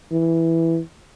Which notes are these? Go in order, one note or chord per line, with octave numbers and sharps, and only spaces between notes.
E3